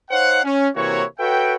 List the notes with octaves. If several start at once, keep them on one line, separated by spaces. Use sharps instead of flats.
D#4 C5 C#5 F5 F#5
C#4
C3 E3 A#3 E4 F#4 C#5
F#4 A4 B4 C#5 E5 G5